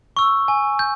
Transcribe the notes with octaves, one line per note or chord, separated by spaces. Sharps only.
C#6 E6
G#5
G6